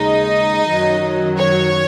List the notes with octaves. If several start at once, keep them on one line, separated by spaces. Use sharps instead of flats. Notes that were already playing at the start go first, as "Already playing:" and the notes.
Already playing: D#2 C#3 G#3 D#4 D#5
F#2 D#3 F#3
C#5